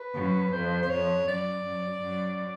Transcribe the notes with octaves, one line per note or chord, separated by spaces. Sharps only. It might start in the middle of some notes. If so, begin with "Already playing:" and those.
Already playing: B4
F#2
F2 C5
C5
F2 C#5
F#2 D5
F#2
F#2